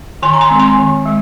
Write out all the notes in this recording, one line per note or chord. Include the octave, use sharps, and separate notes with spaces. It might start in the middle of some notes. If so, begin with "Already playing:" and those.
D#3 G#5 C6
A#5
G#5 C6
G#3 C4
G#5 C6
D#3
G#3